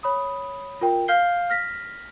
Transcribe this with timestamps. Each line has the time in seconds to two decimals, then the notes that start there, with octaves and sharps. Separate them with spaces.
0.03 C#5 B5 D#6
0.81 F4 A#4 G5
1.08 F5 F6 G6 C7 G7
1.50 F6 A#6 B6